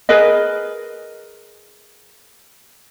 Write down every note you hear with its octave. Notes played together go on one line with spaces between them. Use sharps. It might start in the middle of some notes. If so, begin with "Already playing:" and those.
G#4 A#4 B4 D#5